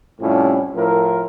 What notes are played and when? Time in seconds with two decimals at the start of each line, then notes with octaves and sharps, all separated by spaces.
0.21 F2 A2 C3 F3 G3 C#4
0.75 A2 F3 E4 A#4